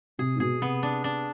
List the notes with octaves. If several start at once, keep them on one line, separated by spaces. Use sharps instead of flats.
C3 G#4
G#2
B2 G#4
C3 B3
D4
D4